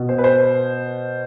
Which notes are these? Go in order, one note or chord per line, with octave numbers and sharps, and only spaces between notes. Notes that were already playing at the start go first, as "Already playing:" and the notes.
Already playing: B2
C5
B4
C5